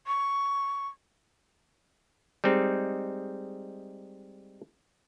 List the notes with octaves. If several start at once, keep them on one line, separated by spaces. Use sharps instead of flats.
C#6
G3 G#3 C4 D#4